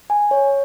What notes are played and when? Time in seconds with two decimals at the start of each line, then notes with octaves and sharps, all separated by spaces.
0.10 G#5
0.31 C#5